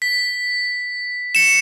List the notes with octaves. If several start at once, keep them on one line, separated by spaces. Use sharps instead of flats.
B6
C#7 E7